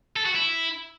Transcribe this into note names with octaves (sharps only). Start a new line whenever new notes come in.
A4
F#4
E4